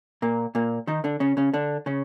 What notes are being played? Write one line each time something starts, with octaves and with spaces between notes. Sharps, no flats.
A#2 A#3
A#2 A#3
D#3 D#4
D3 D4
C#3 C#4
C#3 C#4
D3 D4
C#3 C#4